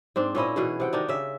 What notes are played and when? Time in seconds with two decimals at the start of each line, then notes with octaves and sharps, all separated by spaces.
0.16 G#2 C4 D4
0.35 A#2 C#4 E4 D#5
0.56 B2 E3 G#4
0.80 C3 F#5 G5
0.93 D#3 D4 D#4
1.09 C#3 E5